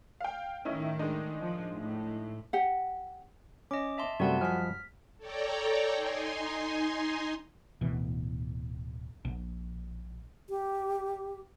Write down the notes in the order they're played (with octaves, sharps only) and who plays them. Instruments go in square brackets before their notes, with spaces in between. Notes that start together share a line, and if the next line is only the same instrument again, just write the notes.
[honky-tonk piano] F5 G5
[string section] A2 D#3 [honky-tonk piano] C#4 D#4 E4
[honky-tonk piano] G#3 D4 D#4
[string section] F3
A2
[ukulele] G4 F#5
[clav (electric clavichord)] C#4 [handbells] D#5 D6
[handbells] E5 A5 C6
[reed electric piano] F#2 G3 [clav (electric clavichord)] C3 A3 [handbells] F#4 F#5 A5
[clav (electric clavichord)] F3 D#5 G#5 [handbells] F6 B6
[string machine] A4 C#5 D5 G5 A#5
D#4 G#5 C6
[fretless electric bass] D1 B2 E3
A#1
[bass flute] G4